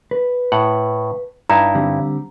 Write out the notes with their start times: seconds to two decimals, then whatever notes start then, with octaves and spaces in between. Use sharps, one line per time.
0.11 B4
0.52 A2 F#5
1.50 G2 D#4 E4 A#5
1.75 D3 G3 C4